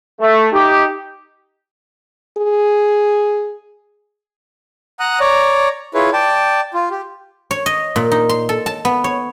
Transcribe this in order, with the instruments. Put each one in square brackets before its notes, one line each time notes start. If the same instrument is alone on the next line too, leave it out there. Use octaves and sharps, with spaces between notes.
[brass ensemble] A3
D#4 G4
[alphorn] G#4
[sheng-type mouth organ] F#5 A#5 D#6 F#6
C#5 D5 A#5
E4 F4 G#4 B4 C#5
D5 G5 A5
F4
G4
[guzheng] C#5
D#5
A#2
D#4
C6
A4
A5
B3
C#5